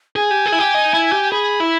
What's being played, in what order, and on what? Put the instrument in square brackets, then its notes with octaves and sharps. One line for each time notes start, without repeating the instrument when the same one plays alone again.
[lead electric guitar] G#4 [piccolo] G#5
[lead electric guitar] G4
G#4
E4
G4
D#4
E4
G4
[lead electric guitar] G#4 [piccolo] B5
[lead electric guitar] E4